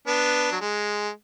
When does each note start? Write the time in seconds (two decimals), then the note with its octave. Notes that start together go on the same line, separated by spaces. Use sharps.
0.07 B3 D4
0.52 F#3
0.61 G#3